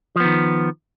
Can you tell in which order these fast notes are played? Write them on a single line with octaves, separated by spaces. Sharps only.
F3 B3 D#3